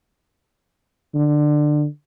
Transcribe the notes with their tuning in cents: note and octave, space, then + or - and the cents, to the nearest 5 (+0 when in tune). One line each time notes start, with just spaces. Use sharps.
D3 +20